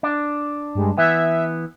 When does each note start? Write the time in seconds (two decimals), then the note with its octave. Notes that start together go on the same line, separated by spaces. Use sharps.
0.03 D4
0.75 G2 G3 G#3
0.97 E3 B3 E5